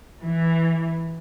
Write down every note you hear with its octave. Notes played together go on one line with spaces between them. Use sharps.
E3